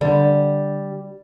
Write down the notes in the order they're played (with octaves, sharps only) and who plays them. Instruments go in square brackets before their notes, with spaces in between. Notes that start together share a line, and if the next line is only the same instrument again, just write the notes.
[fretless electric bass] D3 [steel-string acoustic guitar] G3